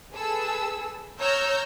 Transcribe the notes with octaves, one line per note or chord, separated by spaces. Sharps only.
G#4 A4 B4 E6
C#5 A#5 E6 F6 G6